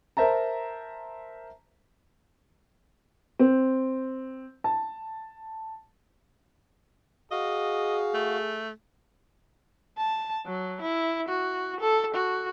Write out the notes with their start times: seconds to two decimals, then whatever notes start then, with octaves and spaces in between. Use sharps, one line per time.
0.17 A#4 C5 E5 A5 A#5
3.39 C4
4.64 A5
7.31 F#4 G#4 D#5 F5
8.14 A3
9.98 A5
10.46 F#3
10.82 E4
11.29 F#4
11.81 A4
12.15 F#4